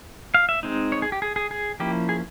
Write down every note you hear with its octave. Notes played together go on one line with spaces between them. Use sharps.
F5
E5
G#3 C4 D#4
C#5
G#4
G4
G#4
G#4
G#4
F3 A#3 C#4 E4 G4
G#4